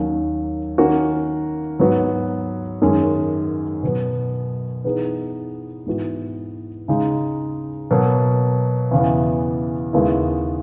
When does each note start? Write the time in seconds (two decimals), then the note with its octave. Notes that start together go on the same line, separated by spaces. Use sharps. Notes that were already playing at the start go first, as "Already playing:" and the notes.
Already playing: D#2 D#3 F#3 C#4
0.78 D#3 A#3 C#4 F#4 A#4
1.79 G#2 F#3 B3 F#4
2.82 F#2 D#3 G#3 C#4
3.83 B2 F#3 B3
4.84 E3 B3 D#4 G#4 B4
5.86 G#2 E3 B3 F#4
6.88 C#3 G#3 D#4
7.91 B2 F#3 A#3
8.91 E2 C#3 E3 B3
9.93 D#2 C#3 G#3 B3 E4